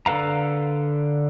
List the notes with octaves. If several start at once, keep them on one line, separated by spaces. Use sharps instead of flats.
D3 A4 B4 F5 A#5